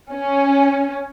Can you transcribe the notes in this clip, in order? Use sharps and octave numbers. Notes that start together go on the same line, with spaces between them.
C#4